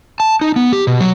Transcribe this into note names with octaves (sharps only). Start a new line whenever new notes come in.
A5
D#4
B3
G4
B2
F#3